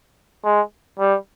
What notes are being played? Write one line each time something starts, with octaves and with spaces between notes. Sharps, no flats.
G#3
G3